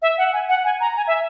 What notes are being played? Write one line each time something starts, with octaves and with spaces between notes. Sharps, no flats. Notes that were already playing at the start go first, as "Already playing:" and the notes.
E5
F#5
G#5
F#5
G#5
A#5
G#5
E5